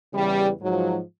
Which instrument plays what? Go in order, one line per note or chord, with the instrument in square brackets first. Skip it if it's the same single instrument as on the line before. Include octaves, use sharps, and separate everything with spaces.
[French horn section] E2 C#3 E3 G3
G#2 F3 F#3